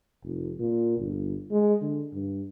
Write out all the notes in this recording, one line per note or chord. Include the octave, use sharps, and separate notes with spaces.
F1
A#2
G1
G#3
D3
G2